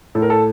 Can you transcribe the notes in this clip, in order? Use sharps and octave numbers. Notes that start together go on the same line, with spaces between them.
A2 A4
A#4
A4